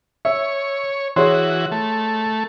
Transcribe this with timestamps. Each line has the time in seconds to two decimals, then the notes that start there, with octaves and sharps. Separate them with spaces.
0.25 C#5 E5
1.16 E3 F#4 G#4 C#5 C6
1.72 A3